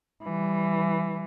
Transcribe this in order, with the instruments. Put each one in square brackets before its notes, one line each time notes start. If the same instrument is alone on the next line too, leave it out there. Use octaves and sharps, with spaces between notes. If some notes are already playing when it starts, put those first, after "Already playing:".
[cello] E3 G3